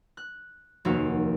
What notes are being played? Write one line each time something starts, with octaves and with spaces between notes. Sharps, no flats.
F#6
F1 D#2 A#3 F#4 F5